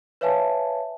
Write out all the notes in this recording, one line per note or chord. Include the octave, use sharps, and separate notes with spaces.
B4 C#5 E5 F5 G#5 A5